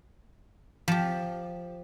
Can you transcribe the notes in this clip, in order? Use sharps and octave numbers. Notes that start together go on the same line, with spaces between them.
F3 G4